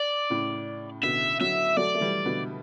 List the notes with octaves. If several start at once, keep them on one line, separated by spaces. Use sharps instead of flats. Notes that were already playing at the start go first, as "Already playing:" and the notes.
Already playing: D5
A2 C#3
B2 D3 E5
D3 F#3 E5
F#3 A3 D5
A3
E3 G3
B2 D3